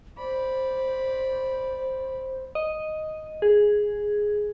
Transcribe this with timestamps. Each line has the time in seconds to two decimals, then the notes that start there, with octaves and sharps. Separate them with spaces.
0.18 C5 D5 B5
2.55 D#5
3.42 G#4